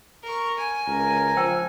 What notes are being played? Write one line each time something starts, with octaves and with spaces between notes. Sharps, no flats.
A#4 C#6
G#5
C#2 A#4
F3 C5 G5 E6